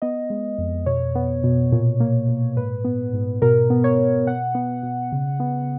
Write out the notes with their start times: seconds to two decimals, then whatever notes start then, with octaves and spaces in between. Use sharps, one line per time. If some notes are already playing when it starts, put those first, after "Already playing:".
0.02 B3 D#5
0.30 G#3
0.58 F2
0.86 B2 C#5
1.15 B3
1.44 B2
1.72 A#2
2.00 A#3
2.28 A#2
2.56 G#2 B4
2.84 B3
3.13 G#2
3.42 B2 A#4
3.70 B3
3.84 C#5
3.98 B2
4.27 B2 F#5
4.55 B3
4.83 B2
5.12 C#3
5.40 B3